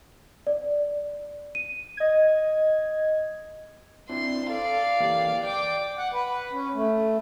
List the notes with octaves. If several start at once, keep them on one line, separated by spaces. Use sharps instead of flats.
D5
D#7
D#5 G#6
C4 D4 E4 C6
A4 D5 F5
E3 A#3 G4
D5 G5 D6
F#5
B4
C#4
A3